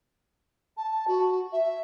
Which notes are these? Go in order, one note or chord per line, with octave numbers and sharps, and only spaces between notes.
A5
F#4
E5